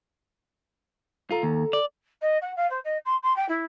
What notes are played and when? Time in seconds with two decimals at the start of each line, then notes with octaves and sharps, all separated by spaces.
1.31 D2 F4 A4 A#5
1.43 D#2
1.73 D5
2.21 D#5
2.41 F#5
2.56 F5
2.70 C5
2.84 D#5
3.05 C6
3.23 C6
3.36 G5
3.48 E4